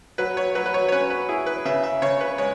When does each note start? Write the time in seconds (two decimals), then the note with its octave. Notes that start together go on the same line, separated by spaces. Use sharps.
0.18 F#3 B4
0.37 C#5
0.55 F#3 B4
0.66 B4
0.74 C#5
0.88 C#5
0.92 C#4 B4
1.10 B4
1.29 E4 G#4
1.46 B4
1.65 C#3 E5
1.83 E5
2.02 C#3 C#5
2.21 B4
2.38 G#3 C#5